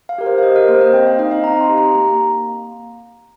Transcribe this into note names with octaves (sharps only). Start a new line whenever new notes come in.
F5
G4 A#4
C5
F5
G4 D#5
A#4
A#3 C5
D#5
C4 G5
F5
D#4 D#5
F5
C4 A#5
C6
G4
A#5
A#3 A#5